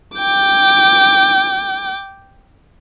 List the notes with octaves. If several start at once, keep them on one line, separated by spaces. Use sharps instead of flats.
G5 D6